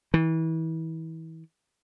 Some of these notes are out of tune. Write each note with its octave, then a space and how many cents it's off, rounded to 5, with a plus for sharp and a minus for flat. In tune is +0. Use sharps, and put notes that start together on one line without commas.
E3 -30